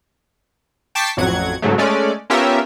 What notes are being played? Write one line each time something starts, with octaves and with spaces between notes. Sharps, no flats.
G5 A5 C#6 D6 B6 C7
A1 F2 F#3 F#5 G#6
G#2 C#3 F#3 A3
G#3 A3 C#4 D5
B3 C#4 F4 G4 A#4 E5